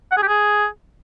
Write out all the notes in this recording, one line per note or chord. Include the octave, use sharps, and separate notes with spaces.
F#5
G#4
G4
G#4